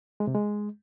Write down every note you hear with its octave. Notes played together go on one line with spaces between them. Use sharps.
G#3
C3
G#3